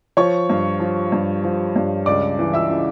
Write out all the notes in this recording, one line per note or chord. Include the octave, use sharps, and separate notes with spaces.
F3 C#5 C#6
G2
F3
G2
F3
G2
C#2 D5 D6
E3
E5 E6
C#3